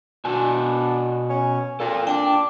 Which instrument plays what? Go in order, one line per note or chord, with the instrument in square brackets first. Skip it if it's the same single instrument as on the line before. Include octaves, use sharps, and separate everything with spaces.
[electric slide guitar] B2 F#4 G#5 [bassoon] D4
[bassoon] C#4
[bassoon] A#2 [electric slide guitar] F4 A4
[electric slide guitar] D4 [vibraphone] G5 A5 D6